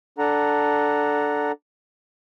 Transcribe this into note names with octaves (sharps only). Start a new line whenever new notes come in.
D4 A4 F#5 A#5